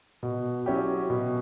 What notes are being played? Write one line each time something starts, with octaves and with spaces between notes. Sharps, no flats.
B2
F#3 C#4 E4 G4
B2